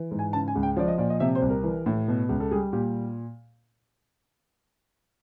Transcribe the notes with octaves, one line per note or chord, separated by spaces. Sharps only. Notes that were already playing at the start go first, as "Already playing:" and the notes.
Already playing: E3
G#2
G#5
C#3 A5
G#5
C#2
G5
F3 D5
D#5
A#2 D5
D#5
C3 E5
C5
C2
A#4
E3
A2
B2
C#2
A4
G3 G#4
A#2 G4